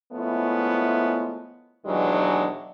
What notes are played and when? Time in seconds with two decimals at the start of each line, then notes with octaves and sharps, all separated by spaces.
0.13 F3 G#3 A3 B3 C#4 E4
1.86 D#2 B2 E3 F#3 G#3 D4